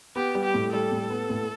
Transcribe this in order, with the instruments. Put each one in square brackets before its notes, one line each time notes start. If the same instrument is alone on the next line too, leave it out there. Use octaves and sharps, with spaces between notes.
[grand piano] B3 [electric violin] G4
[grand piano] G3
[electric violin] G4
[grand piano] A2
[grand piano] G3 [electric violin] A4
[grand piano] A2
B3
A2